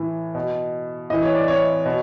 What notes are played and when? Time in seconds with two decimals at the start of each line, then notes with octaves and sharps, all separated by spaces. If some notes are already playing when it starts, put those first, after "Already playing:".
Already playing: A2 E3
0.35 B2
1.10 A2 E3 D#5
1.23 C#5
1.35 D5
1.48 C#5
1.86 B2